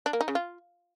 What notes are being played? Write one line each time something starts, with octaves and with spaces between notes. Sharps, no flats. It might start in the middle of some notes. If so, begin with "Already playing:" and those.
D4
A#3
D#4
C#3
F4